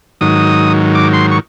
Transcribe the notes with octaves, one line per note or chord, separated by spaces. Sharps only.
G#2 D#3 F#3 D#6
D6
C6
C#6